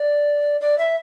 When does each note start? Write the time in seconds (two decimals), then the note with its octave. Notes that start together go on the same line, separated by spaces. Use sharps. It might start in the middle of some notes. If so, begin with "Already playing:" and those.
Already playing: D5
0.61 D5
0.78 E5